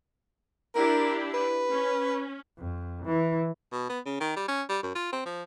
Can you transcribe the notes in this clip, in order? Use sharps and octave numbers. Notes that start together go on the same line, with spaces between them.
D4 E4 G4 A#4
B4
C#4
F2
E3
B2
B3
C#3
D#3
G3
C#4
G3
F#2
F4
C4
F3